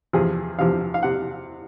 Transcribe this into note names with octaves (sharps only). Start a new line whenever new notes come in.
E2 C3 F3 G#4
E2 C3 F3 F5
F5
C3 F#5